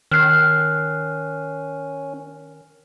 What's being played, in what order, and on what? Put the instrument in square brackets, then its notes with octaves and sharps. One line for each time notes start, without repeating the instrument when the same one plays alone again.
[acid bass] D#3 [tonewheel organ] C#4 [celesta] F6 F#6 C7